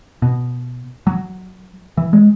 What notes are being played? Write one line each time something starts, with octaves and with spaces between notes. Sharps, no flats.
B2
F#3
E3
G#3